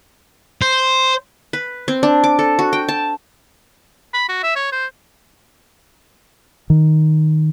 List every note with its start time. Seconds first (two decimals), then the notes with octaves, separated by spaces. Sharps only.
0.62 C5
1.53 B4
1.88 C4
2.03 D4
2.24 D6
2.39 A4
2.59 F#4
2.73 G5
2.89 A5
4.14 B5
4.29 F#4
4.43 E5
4.56 C#5
4.72 C5
6.70 D#3